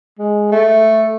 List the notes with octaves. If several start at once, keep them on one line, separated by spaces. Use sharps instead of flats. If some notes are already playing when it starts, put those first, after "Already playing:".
G#3
A3